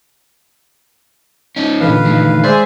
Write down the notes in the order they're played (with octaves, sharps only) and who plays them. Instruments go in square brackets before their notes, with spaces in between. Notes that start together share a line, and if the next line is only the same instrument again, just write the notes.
[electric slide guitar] C#4 D#4
[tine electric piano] A#2 D3 E3 [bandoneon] B4 F5
[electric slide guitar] D#3 A3
[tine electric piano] G#3 G#5 C6 [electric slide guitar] G#4 [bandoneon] C5 D5 E5